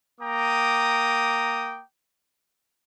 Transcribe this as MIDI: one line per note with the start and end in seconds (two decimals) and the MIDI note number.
0.20 1.80 58
0.20 1.80 79
0.20 1.80 82
0.20 1.80 86
0.20 1.80 87